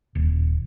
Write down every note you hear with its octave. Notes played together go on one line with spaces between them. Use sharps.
D#1